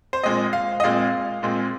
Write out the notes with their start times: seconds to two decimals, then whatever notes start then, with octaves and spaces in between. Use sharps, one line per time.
0.13 C5
0.23 A#2 G#3 C4 D#5
0.53 F5
0.80 D#5
0.83 A#2 G#3 C4 F5
1.43 A#2 G#3 C4